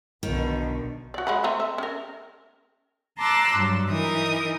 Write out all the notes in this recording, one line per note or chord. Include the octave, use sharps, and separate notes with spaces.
B1 B2 D3 D#3
F#4 D5
G#3 F#5 B5
A3 C4 A#5
E5
C#4 A#4
A5 A#5 C6 D6 E6 F#6
G2 F#3
E3 D#4 A#4 D#6